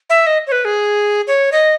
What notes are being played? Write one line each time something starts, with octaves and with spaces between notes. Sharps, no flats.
E5
D#5
C#5
B4
G#4
C#5
D#5